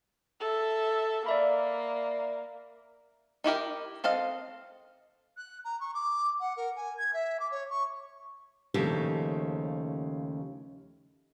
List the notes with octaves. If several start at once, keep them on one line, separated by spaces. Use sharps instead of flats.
A4 E5
A#3 D5 E5 B5
D#4 E4 G4 A#4
C4 A4 D#5 F5
F#6
A#5
C#6
D6
F#5
A#4
G#5
G#6
E5
D6
C#5
C#6
D#2 C#3 F3 A3 G4